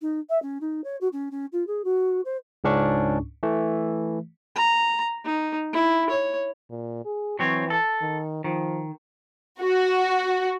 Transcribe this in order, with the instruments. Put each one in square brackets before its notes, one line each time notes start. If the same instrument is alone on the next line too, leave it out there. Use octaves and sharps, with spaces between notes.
[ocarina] D#4
E5
C#4
D#4
C#5
F#4
C#4
C#4
F4
G#4
F#4
C5
[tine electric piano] C#2 G#2 C#4 D4 C#6
E3 A3
[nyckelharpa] A#5
D#4
E4
C#5
[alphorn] A#2
G#4
[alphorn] E3 [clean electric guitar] F#3 C4 C#5
[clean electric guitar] A4
[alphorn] D#3
[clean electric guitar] D#3 [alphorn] F3
[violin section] F#4